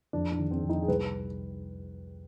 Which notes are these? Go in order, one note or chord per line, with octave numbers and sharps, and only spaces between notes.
F2 D4
D4
D#3
C4
F2
D#4
G#4
C2 B4